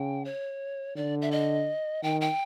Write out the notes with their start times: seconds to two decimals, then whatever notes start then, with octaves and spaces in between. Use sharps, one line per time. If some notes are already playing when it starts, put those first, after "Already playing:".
Already playing: C#3 G5
0.25 C#5
0.96 D3 D5
1.22 E5
1.31 D#5
2.03 D#3 G5
2.21 G5